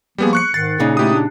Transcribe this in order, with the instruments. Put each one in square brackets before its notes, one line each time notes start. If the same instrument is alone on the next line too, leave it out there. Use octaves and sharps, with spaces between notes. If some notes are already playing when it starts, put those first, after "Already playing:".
[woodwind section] F3 A#3 [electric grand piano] G3 B3 G#4
[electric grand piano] C#6 F#6 C#7
[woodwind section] G#2 D#3 [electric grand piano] A6 C7
[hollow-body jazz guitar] A#2 C#3 D#4 [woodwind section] G#4
[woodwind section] A3 [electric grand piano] E4 G4 D#6
[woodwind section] D4